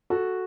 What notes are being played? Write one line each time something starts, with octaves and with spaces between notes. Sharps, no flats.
F#4 A4